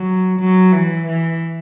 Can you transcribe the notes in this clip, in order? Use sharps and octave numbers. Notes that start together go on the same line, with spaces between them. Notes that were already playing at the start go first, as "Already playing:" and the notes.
Already playing: F#3
F#3
E3
E3